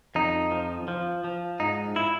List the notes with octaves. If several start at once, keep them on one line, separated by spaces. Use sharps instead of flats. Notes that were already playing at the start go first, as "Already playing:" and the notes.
F2 D#4
F3
F3
F3
G#2 D#4
E4